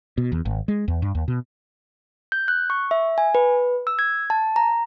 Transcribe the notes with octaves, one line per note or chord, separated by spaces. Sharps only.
B2
E2
G#1
G#3
E2
G2
D#2
B2
G6
F#6
C#6
E5
G#5
B4
E6
G#6
A5
A#5